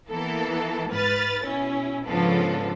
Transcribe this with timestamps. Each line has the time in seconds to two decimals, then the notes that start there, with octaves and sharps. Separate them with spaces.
0.10 E3 A#3 B3 A4
0.91 G#2 B4 F6 A6
1.45 B2 C#4 E4
2.06 G#2 C#3 F3 B3 D4 A4